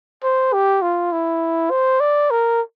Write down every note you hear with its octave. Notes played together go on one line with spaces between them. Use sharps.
C5
G4
F4
E4
C5
D5
A#4